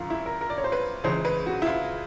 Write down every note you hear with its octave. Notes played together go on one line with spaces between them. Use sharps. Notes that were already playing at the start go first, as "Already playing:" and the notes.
Already playing: G#1 F#2 D3 F4
E4
A#4
A#4
D5
C#5
C5
B4
C#2 C#3 E3 C5
B4
F#4
E4
F4